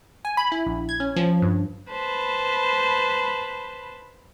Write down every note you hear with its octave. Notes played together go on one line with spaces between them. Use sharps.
G#5
B5
E4
A#1
G#6
C#4
F3
G2
B4 C5 A5 B5